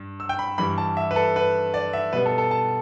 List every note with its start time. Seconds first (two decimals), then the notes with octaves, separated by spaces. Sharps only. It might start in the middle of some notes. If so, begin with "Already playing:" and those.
Already playing: G2
0.20 E6
0.29 G5
0.39 B5
0.58 G2 E3 G3 B5
0.78 A5
0.97 E5
1.11 B4
1.16 A4
1.36 B4
1.74 D5
1.93 E5
2.13 B2 G3 B3 B4
2.26 A4
2.38 A4
2.51 A5